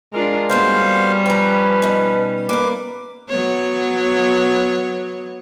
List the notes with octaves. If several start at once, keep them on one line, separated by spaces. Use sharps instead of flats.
G#3 D4 F4 A#4
G3 A#3 B3 C#4 F#4 C5 F5
F3 B4 G5 A#5
B2 D#4
A#3 A#4 B4 D6
F#3 B3 C#5